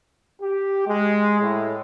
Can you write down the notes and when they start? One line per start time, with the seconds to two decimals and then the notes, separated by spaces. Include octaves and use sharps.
0.42 G4
0.87 G#3
1.41 A2